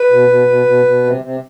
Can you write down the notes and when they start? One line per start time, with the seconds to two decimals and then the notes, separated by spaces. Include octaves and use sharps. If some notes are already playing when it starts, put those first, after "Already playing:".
Already playing: B4
0.10 B2
0.29 B2
0.48 B2
0.66 B2
0.85 B2
1.04 C3
1.22 C3